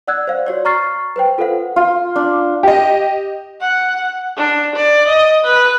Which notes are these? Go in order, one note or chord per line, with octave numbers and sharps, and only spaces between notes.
D5 F#5 E6 F#6 G#6
C5 D5 F5
F#4 C#5 D5
A#5 C#6 F6 A6 C7
B4 C5 G5
F4 A4 B4 C5 F5 F#5
F4
D4
G4 D#5
F#5
D4
D5
D#5
B4